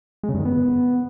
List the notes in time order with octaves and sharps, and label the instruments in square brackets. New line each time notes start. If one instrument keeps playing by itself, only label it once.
[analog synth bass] G#3
C#3
G2
D#3
B3